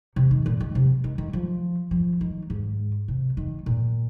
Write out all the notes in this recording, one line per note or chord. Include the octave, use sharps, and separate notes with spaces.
C3
D#3
A#2
D#3
C3
D#3
D#3
F3
F3
D#3
G#2
C3
D#3
A#2